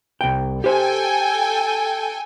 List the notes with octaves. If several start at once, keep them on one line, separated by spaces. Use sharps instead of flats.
C2 G5
G4 A4 C5 G5 G#5